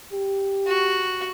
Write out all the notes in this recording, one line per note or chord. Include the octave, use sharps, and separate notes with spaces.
G4
F#4